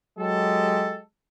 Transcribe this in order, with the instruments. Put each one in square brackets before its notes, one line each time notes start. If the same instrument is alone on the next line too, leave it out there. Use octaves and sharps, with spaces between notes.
[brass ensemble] F#3 G#3 G4 A4